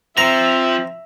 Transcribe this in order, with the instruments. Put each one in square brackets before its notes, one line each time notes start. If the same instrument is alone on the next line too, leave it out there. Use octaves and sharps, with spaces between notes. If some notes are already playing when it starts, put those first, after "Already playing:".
[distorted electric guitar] F3 [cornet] C4 [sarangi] E5 [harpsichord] A#5